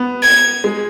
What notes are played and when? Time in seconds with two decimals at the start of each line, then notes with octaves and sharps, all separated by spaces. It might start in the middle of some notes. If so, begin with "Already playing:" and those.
Already playing: B3
0.23 G#6
0.64 G#3